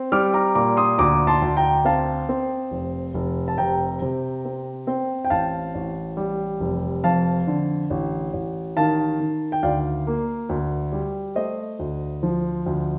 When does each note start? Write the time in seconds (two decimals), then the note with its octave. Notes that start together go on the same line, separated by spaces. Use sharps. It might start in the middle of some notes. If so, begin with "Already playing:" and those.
Already playing: C4
0.12 G3 D6 F6
0.34 A#5 D6
0.55 A#2 A#5 D6
0.77 C6 D#6
0.98 D2 A#5 D6
1.27 A5 C6
1.42 D2
1.57 G5 A#5
1.85 C4 F5 A5
2.29 C4
2.71 F1
3.14 F1
3.48 A5
3.58 C3 G5 A#5
4.02 C3
4.45 C4
4.87 C4
5.25 G5
5.30 A1 F5 A5
5.75 A1
6.17 G3
6.60 F1
7.04 F2 F5 A5
7.47 D3
7.90 A1
8.33 A1
8.77 D#3 F5 A5
9.20 D#3
9.52 G5
9.63 D2 D5 F5
10.07 A#3
10.49 D2
10.92 G3
11.35 A3 C5 D#5
11.79 D2
12.23 F3
12.66 D2